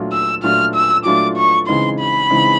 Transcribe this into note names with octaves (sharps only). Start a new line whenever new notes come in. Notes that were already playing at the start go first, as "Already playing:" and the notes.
Already playing: A#2 F#3 A3 D4 F4
E6
A#2 F#3 A3 D4 F4 F6
E6
A#2 F#3 A3 D4 F4 D6
C#6
C#3 E3 G#3 C4 D#4 C6
B5
C#3 E3 G#3 C4 D#4